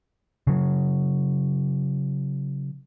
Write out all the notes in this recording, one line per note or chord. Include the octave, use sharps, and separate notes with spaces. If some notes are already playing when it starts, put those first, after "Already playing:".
C#3 F#3